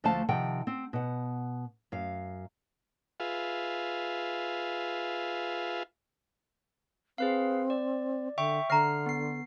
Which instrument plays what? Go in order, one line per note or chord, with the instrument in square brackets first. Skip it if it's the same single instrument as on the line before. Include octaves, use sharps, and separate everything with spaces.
[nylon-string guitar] D2 F3 A3 C5 F5 A5
C3 D#3 F3 F#5 G5
C4
B2 F#5
F#2 F5
[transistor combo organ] F4 G#4 B4 E5 F5
[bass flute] C4 [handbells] G#4 B4 F5
[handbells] D5
[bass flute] D3 [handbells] E5 G5 C#6
[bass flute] D3 [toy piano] E5 A#5 [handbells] F6 C7
[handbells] B3 C7